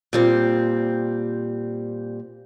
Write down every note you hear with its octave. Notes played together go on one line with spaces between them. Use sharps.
A#2 G3 C4